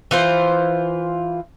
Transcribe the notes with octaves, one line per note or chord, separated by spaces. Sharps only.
E3 F4 C5